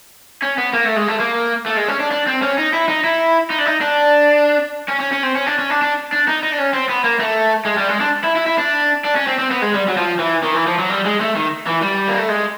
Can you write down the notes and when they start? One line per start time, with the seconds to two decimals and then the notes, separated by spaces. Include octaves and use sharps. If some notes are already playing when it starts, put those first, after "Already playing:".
0.42 C#4
0.58 B3
0.73 A#3
0.85 A3
0.96 G#3
1.07 A3
1.20 A#3
1.66 A3
1.77 G#3
1.88 C#4
2.00 D4
2.11 D4
2.27 C4
2.42 C#4
2.58 D#4
2.73 E4
2.89 D#4
3.04 E4
3.50 D#4
3.59 D4
3.66 D#4
3.81 D4
4.89 C#4
5.00 C#4
5.12 C#4
5.23 C4
5.36 C#4
5.47 D4
5.59 C#4
5.70 D4
5.82 D4
6.12 D4
6.27 D#4
6.43 D#4
6.51 D4
6.58 C#4
6.74 C4
6.90 B3
7.04 A#3
7.20 A3
7.66 G#3
7.78 G3
7.89 G#3
8.01 D4
8.24 E4
8.36 E4
8.46 E4
8.58 D4
9.05 D4
9.16 C#4
9.28 C4
9.39 C4
9.51 B3
9.62 G#3
9.74 G3
9.89 F#3
9.97 F3
10.20 E3
10.43 D#3
10.55 E3
10.67 F3
10.78 F#3
10.89 G3
11.05 G#3
11.20 A3
11.36 D#3
11.67 E3
11.82 G3
12.08 A#3
12.18 A3
12.29 G#3